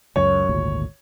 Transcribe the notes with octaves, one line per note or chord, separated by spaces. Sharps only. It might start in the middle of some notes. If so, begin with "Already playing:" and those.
C#2 F#2 C#5
G#1 D2 A#2